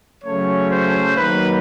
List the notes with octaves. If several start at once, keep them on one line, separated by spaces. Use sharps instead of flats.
C#3 F#3 A3 C#4 C#5
C5
D#3 F#3 A#3 D#4 B4